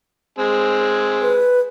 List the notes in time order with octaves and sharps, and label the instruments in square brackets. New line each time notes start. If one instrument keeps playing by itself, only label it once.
[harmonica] G#3 C4 G#5
[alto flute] B4